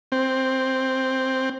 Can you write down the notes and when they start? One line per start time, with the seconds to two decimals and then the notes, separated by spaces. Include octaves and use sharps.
0.12 C4